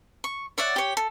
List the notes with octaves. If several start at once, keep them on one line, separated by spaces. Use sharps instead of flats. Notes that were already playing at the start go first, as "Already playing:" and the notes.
C#6
C#5 D5 E5 F#5
G4 C#5
A4